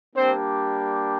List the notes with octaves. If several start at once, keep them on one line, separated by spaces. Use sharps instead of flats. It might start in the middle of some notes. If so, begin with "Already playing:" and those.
G3 A#3 C4 D4 G4 C5